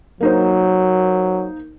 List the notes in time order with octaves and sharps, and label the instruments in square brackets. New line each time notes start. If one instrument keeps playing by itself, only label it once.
[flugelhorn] F#3 [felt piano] A#3 D#4 C5